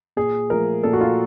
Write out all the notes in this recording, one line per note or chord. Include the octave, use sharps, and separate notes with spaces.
A#2 G#4
F3 A3 A#4
A#2 A4
F#4
F4